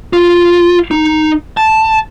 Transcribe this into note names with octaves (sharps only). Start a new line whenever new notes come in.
F4
D#4
A5